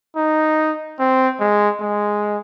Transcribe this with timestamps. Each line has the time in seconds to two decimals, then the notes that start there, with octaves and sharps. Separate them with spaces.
0.16 D#4
0.99 C4
1.40 G#3
1.80 G#3